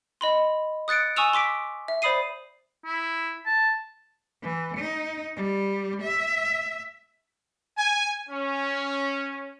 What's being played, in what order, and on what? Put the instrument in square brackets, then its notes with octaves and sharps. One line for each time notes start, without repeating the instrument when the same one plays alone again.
[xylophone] D#5 B5 C6
D#6 F#6 A6 C#7 D7
G#5 C#6 D#6 E6 E7 F7
C6 D6 B6 D7
E5
C5 D5 B5 D#6 C7 D#7
[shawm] E4
A5
[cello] E3
D#4
G3
E5
[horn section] G#5
C#4